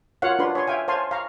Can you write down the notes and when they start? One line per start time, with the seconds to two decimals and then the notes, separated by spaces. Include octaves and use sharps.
0.22 F4 F#4 A#4 C#5 F5 F#5
0.39 D4 F4 B4 C6
0.55 C#5 G#5 C6
0.68 E5 F5 G5 G#5
0.88 C5 C#5 F5 G#5 A5 C6
1.11 F5 A#5 C#6